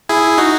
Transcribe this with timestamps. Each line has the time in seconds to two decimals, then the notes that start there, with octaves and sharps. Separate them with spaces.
0.09 E4 G#4
0.38 D#4 F#4